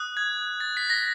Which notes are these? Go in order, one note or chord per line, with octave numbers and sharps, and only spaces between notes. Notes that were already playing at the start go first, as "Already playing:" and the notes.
Already playing: D#6 F#6
G#6
A6
B6
A#6